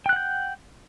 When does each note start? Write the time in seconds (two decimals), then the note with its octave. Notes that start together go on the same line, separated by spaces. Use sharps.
0.06 G5
0.09 F#6
0.13 F#5
0.16 G6